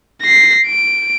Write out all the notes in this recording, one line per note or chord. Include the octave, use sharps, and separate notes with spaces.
A#6 C7
D7